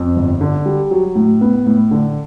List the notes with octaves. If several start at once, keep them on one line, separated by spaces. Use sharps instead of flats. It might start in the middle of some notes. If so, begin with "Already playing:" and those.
Already playing: F2
G1
D3
G3
F#3
A2
B3
A2
D3